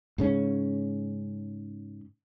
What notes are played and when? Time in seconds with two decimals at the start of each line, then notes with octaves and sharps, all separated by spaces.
0.18 G#2 C#3 C#4